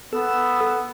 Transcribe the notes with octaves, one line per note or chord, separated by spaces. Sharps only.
B3 A4 E6